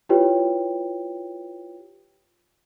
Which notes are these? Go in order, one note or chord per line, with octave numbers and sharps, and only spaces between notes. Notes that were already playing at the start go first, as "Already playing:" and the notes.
E4 F4 G4 B4 C#5 G5